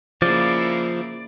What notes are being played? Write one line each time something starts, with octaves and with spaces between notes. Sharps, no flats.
C#3 F3 A#3 E4 D5